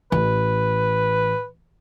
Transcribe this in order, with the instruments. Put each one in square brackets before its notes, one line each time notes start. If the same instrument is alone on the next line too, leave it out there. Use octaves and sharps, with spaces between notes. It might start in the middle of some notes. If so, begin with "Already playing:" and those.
[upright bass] A1 [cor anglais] B4